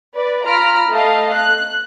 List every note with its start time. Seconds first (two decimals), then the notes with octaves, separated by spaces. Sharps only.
0.15 B4 D5
0.45 F4 A#5 B5 F6 D7
0.89 A3 A4 D#5 F5
1.33 F#6